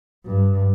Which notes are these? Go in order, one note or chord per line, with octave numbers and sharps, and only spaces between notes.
G2